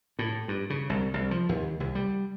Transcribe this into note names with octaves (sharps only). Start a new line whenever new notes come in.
A2
G2
C#3
C2
C2
F3
D#2
C2
G3